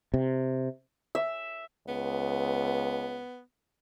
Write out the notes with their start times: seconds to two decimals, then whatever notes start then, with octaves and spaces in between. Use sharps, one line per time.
0.14 C3
1.15 E5
1.88 C#2 B3